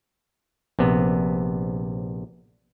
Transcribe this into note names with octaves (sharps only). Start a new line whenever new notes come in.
A#1 C3 B3